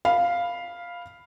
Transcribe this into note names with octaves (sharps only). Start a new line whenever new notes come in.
F5 B5